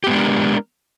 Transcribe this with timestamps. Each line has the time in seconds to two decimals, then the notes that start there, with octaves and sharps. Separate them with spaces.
0.04 G4
0.07 B3
0.10 G#3
0.13 D4
0.16 A#4